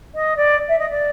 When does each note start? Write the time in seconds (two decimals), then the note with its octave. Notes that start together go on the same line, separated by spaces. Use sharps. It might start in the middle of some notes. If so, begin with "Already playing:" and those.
0.14 D#5
0.36 D5
0.68 E5
0.79 D#5
0.89 D5